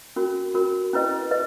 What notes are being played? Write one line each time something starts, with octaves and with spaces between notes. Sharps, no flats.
C#4 F#4 A#4
C#4 F#4 A#4
C#4 E4 B4 D#5
B4 D#5